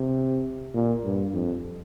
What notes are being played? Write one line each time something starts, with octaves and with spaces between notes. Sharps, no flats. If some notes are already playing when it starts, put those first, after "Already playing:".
Already playing: C3
A#2
G2
F2